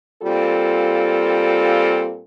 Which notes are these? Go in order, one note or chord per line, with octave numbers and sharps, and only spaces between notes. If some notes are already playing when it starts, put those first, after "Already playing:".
A#2 G3 C4 F4 A4